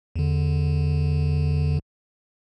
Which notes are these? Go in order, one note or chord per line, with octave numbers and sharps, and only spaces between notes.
E2 D3